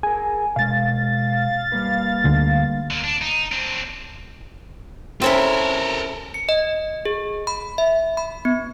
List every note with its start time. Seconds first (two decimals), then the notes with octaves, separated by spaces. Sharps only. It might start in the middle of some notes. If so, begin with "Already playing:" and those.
0.03 G#4 A#4 G#5
0.56 B2 G#3 F5 A6
1.72 G3 A#3 B4
2.24 D2 D3
2.91 D3 A#3
3.04 D4
3.22 D#4
3.52 C4 D4
5.22 C4 C#4 E4 A4 A#4
6.34 C#7
6.49 D#5
7.05 G#4
7.47 B5
7.78 E5
8.17 B5
8.45 B3